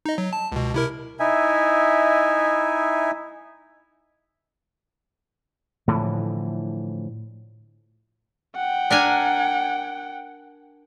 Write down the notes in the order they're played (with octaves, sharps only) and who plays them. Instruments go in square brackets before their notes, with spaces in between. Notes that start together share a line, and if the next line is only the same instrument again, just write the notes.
[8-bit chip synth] D#4 D#5
F#3
A5
C#2 B2
C3 E4 A#4
[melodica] D#4 E4 E5 G#5
[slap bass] A2 D3 E3 F3
[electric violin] F#5 G5
[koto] D4 A#4 G#5